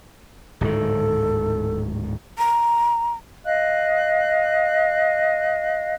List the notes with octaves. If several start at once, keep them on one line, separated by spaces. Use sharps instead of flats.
D1 G#2 D#3 A4
A#5
D#5 F5 F#6